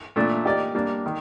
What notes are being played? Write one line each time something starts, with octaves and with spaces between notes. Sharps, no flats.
A#2 A3 D4
A#3 D#4 G4 D5
G3 A#3 D4
D#3